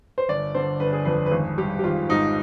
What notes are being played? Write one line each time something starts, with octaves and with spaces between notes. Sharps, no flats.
C5
G1 D5
D3 C5
G1 B4
G#4
F2 B4
B4
G#1 G#4
G3 G4
G4
G#1 F4
G#2 D#4